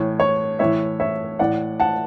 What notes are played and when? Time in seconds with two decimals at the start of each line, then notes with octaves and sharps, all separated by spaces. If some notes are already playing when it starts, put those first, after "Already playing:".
Already playing: A2 E3 C#5
0.20 C#5
0.59 A2 E3 C#5 E5
1.00 C#5 E5
1.39 A2 E3 D5 F#5
1.80 F#5 A5